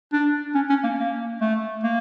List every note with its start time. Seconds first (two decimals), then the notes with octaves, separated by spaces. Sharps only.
0.13 D4
0.55 C#4
0.70 C#4
0.84 A#3
0.99 A#3
1.41 A3
1.84 A#3